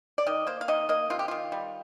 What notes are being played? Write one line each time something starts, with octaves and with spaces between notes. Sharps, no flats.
D5
D#3 D#5
A#3 C5
F5
D#3 D#5
A#3 D#5
C3 F4
G4
D#3 F4
G3